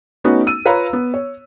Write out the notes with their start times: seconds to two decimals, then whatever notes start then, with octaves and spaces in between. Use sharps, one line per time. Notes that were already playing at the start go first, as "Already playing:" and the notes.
0.24 A3 B3 C#4 D#4 F#4
0.47 E6 D#7
0.65 F4 B4 C#5 F5 A#5 B5
0.93 B3
1.14 C#5